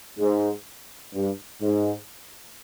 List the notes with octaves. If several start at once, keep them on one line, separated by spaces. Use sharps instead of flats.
G#2
G2
G#2